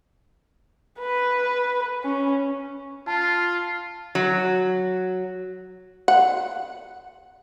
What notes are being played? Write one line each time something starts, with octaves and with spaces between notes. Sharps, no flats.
B4
C#4
F4 A5
F#3
F#5